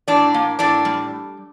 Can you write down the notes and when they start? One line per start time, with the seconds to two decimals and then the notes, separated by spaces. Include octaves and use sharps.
0.08 A2 D4 D5
0.34 A#3
0.59 A2 D4 D5
0.85 G3